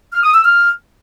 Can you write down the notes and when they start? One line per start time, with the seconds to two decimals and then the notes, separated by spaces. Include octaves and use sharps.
0.13 F6
0.23 D#6
0.34 E6
0.45 F6